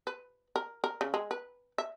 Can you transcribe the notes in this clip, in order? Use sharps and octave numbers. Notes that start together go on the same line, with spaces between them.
B4
A#4
A#4
C#3
G#3
B4
E5